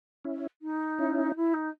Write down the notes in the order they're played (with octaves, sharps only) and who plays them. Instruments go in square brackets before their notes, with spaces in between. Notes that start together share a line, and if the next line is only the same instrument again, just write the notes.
[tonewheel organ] C#4 E4
[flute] D#4
[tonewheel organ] C#4 E4
[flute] E4
D#4